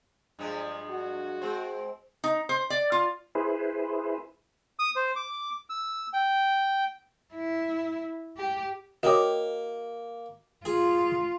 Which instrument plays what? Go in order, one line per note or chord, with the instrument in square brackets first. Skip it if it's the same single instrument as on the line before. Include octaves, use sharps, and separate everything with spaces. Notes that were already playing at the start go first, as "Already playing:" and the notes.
[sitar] G2 F3 G#3
[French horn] F#4
[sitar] G#3 C4 C5
[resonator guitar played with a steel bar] D#4
C5
D5
F4
[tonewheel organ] E4 G#4 B4 C5
[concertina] D#6
C5
D6
E6
G5
[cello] E4
G4
[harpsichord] A#3 [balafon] F#4 C#5 [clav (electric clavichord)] G4 D#5
[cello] F4 [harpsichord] G#4